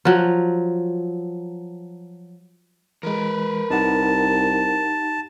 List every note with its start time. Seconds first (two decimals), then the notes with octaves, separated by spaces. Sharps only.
0.05 F3 F#3
3.03 E3 G#3 A#4 B4
3.71 C2 D#4 G4 F#5 A5